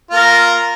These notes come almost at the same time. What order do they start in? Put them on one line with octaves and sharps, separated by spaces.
F4 A#3 A#4